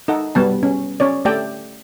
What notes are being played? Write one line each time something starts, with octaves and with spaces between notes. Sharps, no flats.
D#4 A4 F#5
G3 B3 A5
C#4
C#4 C#5 D5
A3 G4 A4 D5 G5